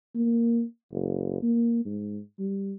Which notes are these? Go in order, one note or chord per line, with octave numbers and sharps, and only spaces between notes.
A#3
F#1
A#3
G#2
G3